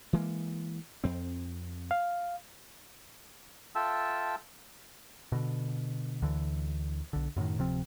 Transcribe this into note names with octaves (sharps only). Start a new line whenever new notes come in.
E3 G#3 A#3
F2 C4
F5
F4 A4 E5 G5 A5 E6
B2 D3
D2 D3 E3
B1 D3
F#2 A2 C3 D#3
D1 C3 F3 C4